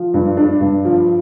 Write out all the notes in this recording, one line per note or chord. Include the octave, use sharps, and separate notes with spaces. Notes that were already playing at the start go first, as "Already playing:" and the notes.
Already playing: F3
G2
D4
G2
F3